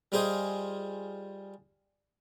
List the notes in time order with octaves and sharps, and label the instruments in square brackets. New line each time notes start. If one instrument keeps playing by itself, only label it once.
[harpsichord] G3 F4 G#4 C5 D#5